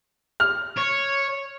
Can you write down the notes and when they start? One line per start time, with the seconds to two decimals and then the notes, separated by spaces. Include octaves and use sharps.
0.40 F6
0.77 C#5